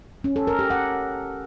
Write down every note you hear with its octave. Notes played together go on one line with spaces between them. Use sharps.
C#4
A4
A#4
G4
F#5